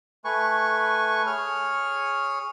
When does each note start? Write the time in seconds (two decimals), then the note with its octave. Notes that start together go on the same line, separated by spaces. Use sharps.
0.25 A3 B4 G#5 C#6
1.27 G#4 C#5 F6